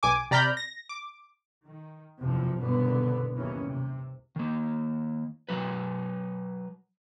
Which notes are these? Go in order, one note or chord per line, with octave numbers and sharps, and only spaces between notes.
B1 G#5 D6
C3 D5 A#5 B5 F6 G6
A#6
D6
D#3
F#1 B1 E2 C3 F3
G1 C2 F#2 B2 D3 B3
F#1 D#2 D#3 E3 C#4
C3
D#3 A#3
F#3 A#4 B4